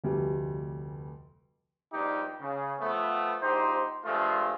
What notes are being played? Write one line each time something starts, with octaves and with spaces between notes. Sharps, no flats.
F1 D2 G3
A#1 G2 G3 D4 D#4 G4
C#3
F3 A3 B3
A#1 D#4 G4 C5
G2 F3 G#3 A3 F4